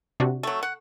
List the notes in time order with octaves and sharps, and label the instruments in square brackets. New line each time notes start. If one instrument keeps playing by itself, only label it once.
[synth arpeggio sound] C3 D4 F#4
[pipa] F#3 A3
F#5